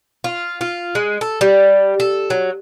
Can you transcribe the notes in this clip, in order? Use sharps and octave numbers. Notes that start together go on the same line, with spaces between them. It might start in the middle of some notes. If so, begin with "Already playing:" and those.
F4
F4
G#3
A4
G3
A4
F#3